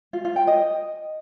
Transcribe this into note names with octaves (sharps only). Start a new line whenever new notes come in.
F4
F4
G5
D#5